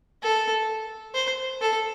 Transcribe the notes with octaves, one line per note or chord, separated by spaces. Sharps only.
A4
C5
A4